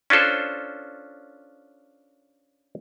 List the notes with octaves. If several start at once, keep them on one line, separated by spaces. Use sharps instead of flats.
C#4 D4 F4 A4 C5